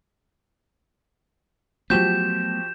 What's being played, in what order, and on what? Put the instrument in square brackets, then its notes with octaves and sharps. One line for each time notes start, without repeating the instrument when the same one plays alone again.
[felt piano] F3 F#4 G4 [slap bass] F#3 A3 B3 [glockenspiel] G6 E7